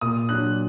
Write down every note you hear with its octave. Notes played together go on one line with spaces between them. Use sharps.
A#2 D#6
F#3 D4 F#6